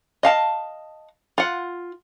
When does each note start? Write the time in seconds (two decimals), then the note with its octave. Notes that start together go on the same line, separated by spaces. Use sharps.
0.23 D#5 F5 A5
1.38 F4 F#5